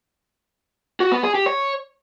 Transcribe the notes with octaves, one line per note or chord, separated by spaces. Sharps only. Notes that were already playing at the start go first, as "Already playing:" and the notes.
F#4
B3
G#4
G4
C#5